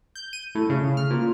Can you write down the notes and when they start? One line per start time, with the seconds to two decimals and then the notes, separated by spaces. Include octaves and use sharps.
0.15 G6
0.33 D#7
0.55 A2
0.70 C#3
0.97 F6
1.11 A#2